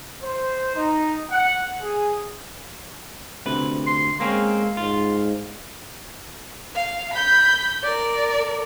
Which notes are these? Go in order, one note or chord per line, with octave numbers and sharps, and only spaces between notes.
C5
D#4
F#5
G#4
D2 C3 B4
C6
G#3 A#3 C4 C#4 F5
G#2 F4
F5
B5 G6
A#4 D5